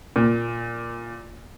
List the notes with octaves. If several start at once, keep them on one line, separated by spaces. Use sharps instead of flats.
A#2